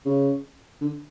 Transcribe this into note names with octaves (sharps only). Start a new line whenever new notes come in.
C#3
D3